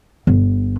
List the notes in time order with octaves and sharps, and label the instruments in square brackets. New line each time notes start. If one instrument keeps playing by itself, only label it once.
[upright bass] G1